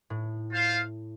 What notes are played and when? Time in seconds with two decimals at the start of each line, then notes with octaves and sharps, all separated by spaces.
0.10 A2
0.51 F4 C5 F5